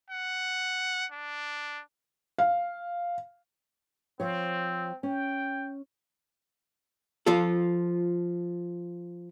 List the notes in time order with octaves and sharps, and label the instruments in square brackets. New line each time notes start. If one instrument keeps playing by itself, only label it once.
[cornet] F#5
D4
[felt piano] F5
[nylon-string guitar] F3 C#5 [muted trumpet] C4
[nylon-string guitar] C#4 [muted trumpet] G5
[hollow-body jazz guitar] F3 F4 A4